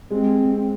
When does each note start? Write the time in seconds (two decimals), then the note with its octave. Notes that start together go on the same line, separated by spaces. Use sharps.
0.11 G#3 C4
0.53 C4